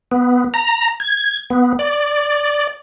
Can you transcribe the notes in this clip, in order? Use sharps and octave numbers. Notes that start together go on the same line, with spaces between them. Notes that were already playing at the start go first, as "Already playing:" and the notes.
B3
A#5
G#6
B3
D5